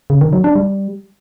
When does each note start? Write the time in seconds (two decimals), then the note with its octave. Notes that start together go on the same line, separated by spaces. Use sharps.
0.10 C#3
0.21 D#3
0.33 F#3
0.44 D4
0.56 G3